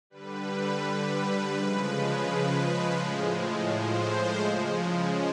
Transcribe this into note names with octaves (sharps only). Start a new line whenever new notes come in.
D3 G3 B4
B4
C#3 F3 G#3
A2 F3 G#3
C5
C#3 F3 G#3